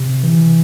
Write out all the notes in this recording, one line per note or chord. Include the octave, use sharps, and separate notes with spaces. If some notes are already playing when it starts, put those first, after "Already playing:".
Already playing: C3
E3